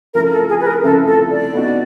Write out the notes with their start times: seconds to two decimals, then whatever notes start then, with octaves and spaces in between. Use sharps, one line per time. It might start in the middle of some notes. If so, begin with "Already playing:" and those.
0.14 C#3 F3 A3 C4 E4 A#4
0.32 A4
0.49 G#4
0.61 B4
0.67 A#4
0.84 C#3 F3 A3 C4 E4 A4
1.07 A4
1.31 D5
1.54 B3 D#4 F#4